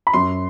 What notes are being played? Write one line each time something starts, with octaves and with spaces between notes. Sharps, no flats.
B5
F#2 C6